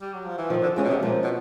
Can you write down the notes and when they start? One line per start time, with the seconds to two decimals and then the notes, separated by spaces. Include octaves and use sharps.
0.01 G3
0.14 F#3
0.26 F3
0.38 E3
0.50 D#3 F3
0.63 D3
0.77 C#3 G#3 C#4
0.83 B2
0.89 C3
1.03 A#2 F3
1.24 B2